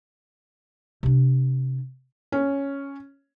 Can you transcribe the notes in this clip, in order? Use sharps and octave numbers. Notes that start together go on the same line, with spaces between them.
C3 D4
C#4